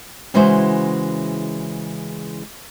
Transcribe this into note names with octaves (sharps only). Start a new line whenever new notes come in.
C#3 E3 G#3 E4 F#4 C5